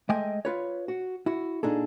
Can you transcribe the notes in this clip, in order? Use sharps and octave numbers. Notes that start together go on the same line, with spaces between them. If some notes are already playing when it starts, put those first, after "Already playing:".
G#3 A3 D#5 G5 G#5
F4 B4 C#5
F#4
E4 F#4
A#2 D4 D#4 G#4 A4